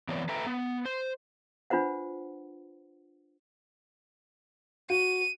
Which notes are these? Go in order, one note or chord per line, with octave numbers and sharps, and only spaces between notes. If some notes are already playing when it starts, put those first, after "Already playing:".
E3 B3 C4 C#5 D5
A4 B4 E5 G5 A#5
B3
C5
D4 F4 B4 C5 F#5
F#4 D#7